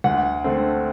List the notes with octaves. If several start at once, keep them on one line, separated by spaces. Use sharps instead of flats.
D2 F#5
D3 A3 C4